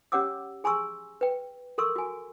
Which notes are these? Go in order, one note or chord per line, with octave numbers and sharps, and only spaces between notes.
C#4 G4 C#5 F#5 D6 E6
G#4 G#5 A#5 C6 C#6 E6
B4 G5
A4 A#4 C6 C#6 E6
F#4 G#5